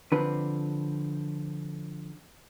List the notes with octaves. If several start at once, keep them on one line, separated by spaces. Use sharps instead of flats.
D3 F3 C4 D4 B4